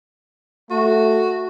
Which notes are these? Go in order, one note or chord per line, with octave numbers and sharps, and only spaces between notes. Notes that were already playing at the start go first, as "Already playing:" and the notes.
A3 F#4